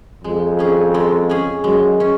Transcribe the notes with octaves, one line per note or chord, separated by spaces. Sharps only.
F2 G#3
C#4 G#4
G#3
C#4 G#4
F#2 G#3
C#4